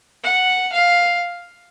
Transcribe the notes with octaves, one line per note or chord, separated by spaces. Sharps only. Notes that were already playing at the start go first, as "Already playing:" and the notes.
F#5
F5